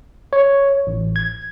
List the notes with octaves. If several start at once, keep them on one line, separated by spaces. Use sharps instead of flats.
C#5
A1
G#6